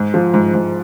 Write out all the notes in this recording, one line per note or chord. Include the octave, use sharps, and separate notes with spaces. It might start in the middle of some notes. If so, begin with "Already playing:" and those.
Already playing: G#2
F3
G#2
G#2